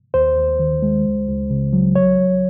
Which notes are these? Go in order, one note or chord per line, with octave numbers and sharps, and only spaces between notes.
D#2 C5
D#2
D#3
G#3
C#2
C#2
C#3
F#3
C2 C#5
C2